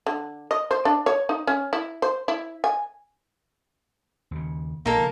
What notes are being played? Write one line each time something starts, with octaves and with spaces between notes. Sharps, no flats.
D3
D#5
C5
D4
C#5
D#4
C#4
E4
C5
E4
G#5
D#2 C#3
A#1 A#3 D#4 A4
C#3 F3